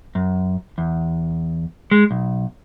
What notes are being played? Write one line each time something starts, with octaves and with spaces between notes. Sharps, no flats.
F#2
E2
G#3
B1